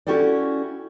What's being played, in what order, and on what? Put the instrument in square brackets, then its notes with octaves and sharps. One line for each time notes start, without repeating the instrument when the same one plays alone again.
[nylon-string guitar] C#4 E4 F#4 G4 A4 D5